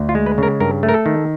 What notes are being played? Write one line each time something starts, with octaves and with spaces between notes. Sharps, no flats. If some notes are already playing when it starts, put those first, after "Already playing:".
Already playing: D2
F4
G#3
B4
C#3 A#4
G2 A#4
A3
A#4
A4
D#3